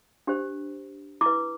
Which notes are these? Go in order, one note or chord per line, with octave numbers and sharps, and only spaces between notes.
D4 G4 C5
E4 B4 D6